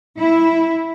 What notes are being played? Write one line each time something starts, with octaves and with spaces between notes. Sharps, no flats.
E4